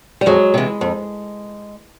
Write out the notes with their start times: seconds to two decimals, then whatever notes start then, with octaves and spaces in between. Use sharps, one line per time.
0.21 G3
0.26 F2 F#3 G#3
0.54 C3 E3
0.81 F2